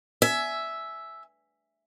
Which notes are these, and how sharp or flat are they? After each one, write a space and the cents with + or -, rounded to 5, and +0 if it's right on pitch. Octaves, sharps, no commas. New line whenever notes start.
E5 +0 G#5 +20